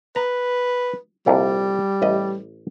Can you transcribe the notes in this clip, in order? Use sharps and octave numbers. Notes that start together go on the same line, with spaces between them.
B4 A#5
C2 F2 A#2 G3
A1 B4 D#5